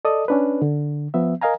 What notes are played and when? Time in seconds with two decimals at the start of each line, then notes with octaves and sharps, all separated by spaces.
0.05 A4 D5 D#5 D#6
0.28 C#4 D4 B4
0.62 D3
1.14 F3 B3 E5
1.42 A#4 D#5 F5 G#5 A#5